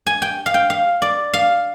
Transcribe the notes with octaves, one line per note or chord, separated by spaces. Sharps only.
G#5
G5
F5
G5
F5
D5
F5